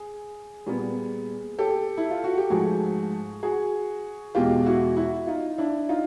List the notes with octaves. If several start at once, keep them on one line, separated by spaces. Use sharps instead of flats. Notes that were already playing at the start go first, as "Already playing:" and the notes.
Already playing: G#4
A#2 G3 B3
G4 A4
E4
F4
F#4
G4
G#2 F3 A3 F#4 G#4
F#4 G#4
E2 B2 G#3 F4 G4
E4 F#4
E4 F#4
D#4 F4
D4 E4
D#4 F4